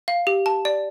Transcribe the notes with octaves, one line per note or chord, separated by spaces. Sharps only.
F5
G4
A5
D5